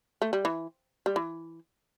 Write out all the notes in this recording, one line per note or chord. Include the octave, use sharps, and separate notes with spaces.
A3
G3
E3
G3
E3